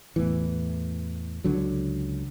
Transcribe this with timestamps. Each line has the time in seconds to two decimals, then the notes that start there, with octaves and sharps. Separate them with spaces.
0.16 E2 A2 E3
1.44 C#2 D3 F#3